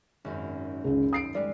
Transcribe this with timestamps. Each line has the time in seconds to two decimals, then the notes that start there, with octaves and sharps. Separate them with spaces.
0.25 G#1 F#2
0.84 C#2 C#4
1.13 D#6 C7 D7
1.35 G3 G#3 D5